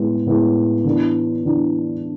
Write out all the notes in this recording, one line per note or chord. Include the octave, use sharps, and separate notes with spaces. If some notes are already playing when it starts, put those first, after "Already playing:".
Already playing: A2 G#3 B3 E4
A2 G#3 B3 E4
E3 B3 D4
E3 B3 D4